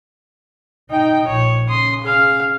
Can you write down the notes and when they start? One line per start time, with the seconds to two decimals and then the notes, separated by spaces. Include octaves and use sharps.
0.90 D#4 D#5 G5
1.27 A#1 C#5
1.69 C#3 C6 D#6
2.04 G#4 F5